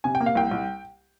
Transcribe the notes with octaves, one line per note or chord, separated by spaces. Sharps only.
C3 G#5
G5
A#3
F5
C2 G5
C2